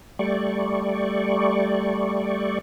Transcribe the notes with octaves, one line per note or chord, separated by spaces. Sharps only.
G3 A3 D5 C#6